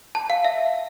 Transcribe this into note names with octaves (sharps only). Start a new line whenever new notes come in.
A5
F5
E5